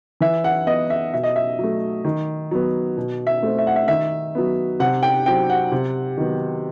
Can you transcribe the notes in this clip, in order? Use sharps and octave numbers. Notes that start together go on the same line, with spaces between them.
E3 E5
F#5
B3 D#5
E5
B2 E5
D#5
E5
F#3 A3
D#3
F#3 B3
B2
E5
A3 C4
E5
F#5
E5
D#3 E5
F#3 B3
C3 F#5
G5
F#3 C4 G5
F#5
C3
D#3 F#3 B3